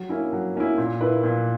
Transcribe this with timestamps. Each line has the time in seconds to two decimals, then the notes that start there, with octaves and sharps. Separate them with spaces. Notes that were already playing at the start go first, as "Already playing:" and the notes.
Already playing: F#3
0.09 A#3 C#4 E4
0.33 F#3
0.55 A#3 C#4 E4
0.78 A#2
1.01 A#3 E4 B4
1.24 A#2